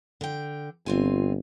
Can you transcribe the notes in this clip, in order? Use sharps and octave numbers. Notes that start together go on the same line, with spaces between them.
D3 G5
G1 C4 F4 G#5